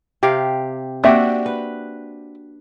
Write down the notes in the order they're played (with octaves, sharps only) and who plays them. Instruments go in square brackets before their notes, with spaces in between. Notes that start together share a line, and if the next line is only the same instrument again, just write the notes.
[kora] C3 G4 F5
[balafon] A#3 [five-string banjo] C4 E5 [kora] D4 F#4 G4
[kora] B4